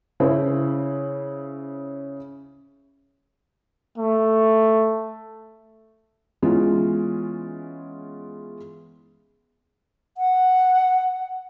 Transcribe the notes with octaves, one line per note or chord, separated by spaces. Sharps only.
C#3 E4 C5
A3
E3 G#3 B3 C#4 F4
F#5